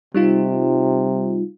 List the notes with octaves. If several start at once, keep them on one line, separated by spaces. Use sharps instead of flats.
C3 G3 D#4 F4